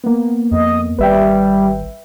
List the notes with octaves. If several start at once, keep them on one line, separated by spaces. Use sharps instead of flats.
A#3 B3
F2 D#5
G#1 G3 B4 E5 G5